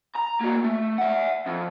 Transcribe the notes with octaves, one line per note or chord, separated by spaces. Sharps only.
A#5
A#3 F#4
A3
E5 F#5
F2